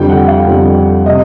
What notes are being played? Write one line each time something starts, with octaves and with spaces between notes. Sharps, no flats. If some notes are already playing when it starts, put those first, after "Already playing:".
Already playing: F2 D3 G3 G5
F#5
F5
F2 D3 G3
C3 D#5